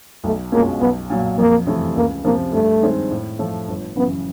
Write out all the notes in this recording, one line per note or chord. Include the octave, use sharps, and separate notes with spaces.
B1 A3
B2 G#3 A#3 C#4 F4
B1 B3
A#2 F#3
F2 A#3
C3 E3 A3
C#2 A#3
C3 F3 A#3
G2 A3
D#3 G#3 C4
A2
F3 A3
G1
F#2 C#3 E3 B3